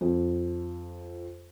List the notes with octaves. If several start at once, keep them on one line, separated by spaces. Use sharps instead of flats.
F2